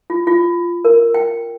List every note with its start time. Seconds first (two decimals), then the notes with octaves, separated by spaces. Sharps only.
0.10 F4
0.27 F4
0.85 A#4
1.14 G5